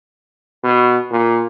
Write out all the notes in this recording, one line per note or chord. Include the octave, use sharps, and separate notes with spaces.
B2
A#2